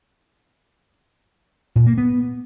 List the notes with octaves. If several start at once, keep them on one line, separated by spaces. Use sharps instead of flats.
A#2
A#3
B3